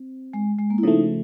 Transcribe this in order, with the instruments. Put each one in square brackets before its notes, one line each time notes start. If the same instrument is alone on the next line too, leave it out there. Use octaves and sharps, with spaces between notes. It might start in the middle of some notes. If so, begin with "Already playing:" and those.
Already playing: [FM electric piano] C4
[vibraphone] G#3
G#3
A#3
E4
[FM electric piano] C#3 F3 A3 [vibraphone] D#4